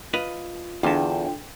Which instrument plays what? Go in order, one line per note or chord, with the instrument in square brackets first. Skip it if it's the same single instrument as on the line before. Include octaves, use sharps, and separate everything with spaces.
[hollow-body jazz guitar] F4 B4 D#5
[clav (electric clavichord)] E2 [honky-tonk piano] D3 G5 [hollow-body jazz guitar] F4 A5